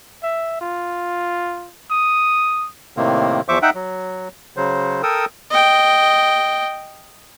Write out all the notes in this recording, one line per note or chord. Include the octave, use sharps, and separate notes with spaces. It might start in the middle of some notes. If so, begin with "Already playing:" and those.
E5
F4
D#6
A2 C3 D#3 A#3
E2 F3 C5 E5 C#6 D6
D#4 E5 F#5 G5
F#3
C#3 F#3 C5
A4 A#4 G5 D#6 E6
D#5 G5